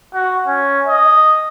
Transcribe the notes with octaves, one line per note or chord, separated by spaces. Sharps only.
F#4
C#4
D#5